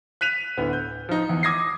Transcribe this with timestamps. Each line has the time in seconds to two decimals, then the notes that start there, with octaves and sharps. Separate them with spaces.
0.21 F#6 B6 D#7 F7
0.57 D2 A2 B3
0.73 G6
1.09 F3 D#4
1.29 E2
1.43 D6 D#6 G#6 A#6 C7